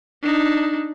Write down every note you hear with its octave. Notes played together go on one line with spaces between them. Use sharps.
D4 D#4